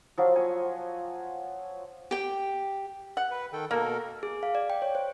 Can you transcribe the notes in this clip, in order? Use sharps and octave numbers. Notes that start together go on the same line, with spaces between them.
F3 F#3 F4
G#5 C#6
G4 G5
F#5
B4
D#3 A4 G5
B2 A#3 A4 A#4
G#4
F5
D5
G5
C#5
C5